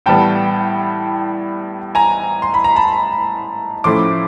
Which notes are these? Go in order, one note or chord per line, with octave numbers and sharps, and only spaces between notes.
A2 E3 G3 B3 G5 A5
G#5 A#5
C6
B5
A#5
A5 B5
A2 F3 A3 C#4 E4 C6 D6